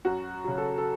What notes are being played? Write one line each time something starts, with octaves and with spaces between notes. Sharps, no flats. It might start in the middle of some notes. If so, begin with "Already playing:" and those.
F#2 F#4
C#3 F#3
A4
A4